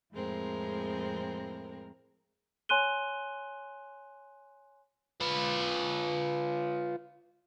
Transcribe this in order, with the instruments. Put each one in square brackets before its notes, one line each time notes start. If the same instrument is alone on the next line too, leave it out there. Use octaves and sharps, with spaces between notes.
[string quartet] F2 A2 G#3 C4 A#4
[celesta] C#5 G#5 C6 F#6 D#7 G7
[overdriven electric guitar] F4 B4